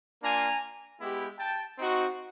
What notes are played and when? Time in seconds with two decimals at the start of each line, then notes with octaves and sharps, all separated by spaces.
0.22 A#3 D4 F4 G#5 A#5
1.00 G#3 B3 E4 G4
1.39 G5 A5
1.79 C4 D#4 F#4